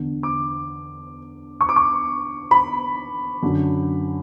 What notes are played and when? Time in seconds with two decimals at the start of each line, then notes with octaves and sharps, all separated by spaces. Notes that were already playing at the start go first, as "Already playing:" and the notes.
Already playing: E2 D3
0.23 D6
1.61 C#6
1.69 D6
1.76 C#6
2.51 B5
3.43 F#2 D3